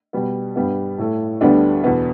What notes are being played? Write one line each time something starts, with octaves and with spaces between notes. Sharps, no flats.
B2 G3 B3
G2 G3 B3
A2 A3
D2 D3 G3 B3 D4
E2 B2 B3